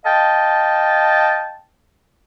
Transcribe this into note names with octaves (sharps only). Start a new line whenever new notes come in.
D#5 F5 G5 A5